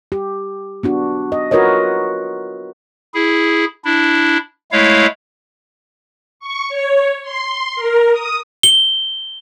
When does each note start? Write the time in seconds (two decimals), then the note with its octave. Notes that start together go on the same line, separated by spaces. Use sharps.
0.12 G4
0.83 B3 D4 F#4
1.32 D#5
1.51 F4 F#4 A#4 B4 C#5 D#5
3.14 E4 G#4
3.85 D4 E4
4.72 G#3 A3 E4 C#5 F5
6.40 C#6
6.69 C#5
7.23 C6
7.76 A#4
8.12 D#6
8.63 G7